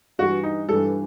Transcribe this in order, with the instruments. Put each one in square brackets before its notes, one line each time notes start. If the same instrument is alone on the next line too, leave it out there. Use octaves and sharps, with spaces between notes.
[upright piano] G2 E3 G3 [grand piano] F#4
[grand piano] D#4
[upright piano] G2 E3 G3 [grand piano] A4